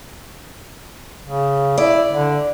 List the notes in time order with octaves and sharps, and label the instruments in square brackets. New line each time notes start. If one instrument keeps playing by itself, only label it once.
[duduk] C#3
[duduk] E4 [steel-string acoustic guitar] D5
[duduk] D3